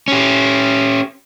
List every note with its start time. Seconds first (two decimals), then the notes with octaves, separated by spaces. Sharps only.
0.08 C#4 G4